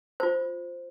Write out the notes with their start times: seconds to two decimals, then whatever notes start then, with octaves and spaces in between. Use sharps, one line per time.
0.20 F4 C5